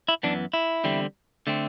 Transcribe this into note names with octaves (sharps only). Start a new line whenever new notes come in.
E4
F#2 E3 B3 D4
E4
E2 D3 G3 C4
D3 A3 C4